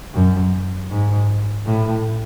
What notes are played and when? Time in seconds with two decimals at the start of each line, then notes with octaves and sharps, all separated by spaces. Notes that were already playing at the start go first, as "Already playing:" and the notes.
0.14 F#2
0.90 G#2
1.66 A2